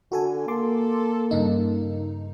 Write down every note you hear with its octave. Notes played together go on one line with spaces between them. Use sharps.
D3 F#4 A4 G#5
A#3 A4 A5 C6 D6
G2 C#3 D#4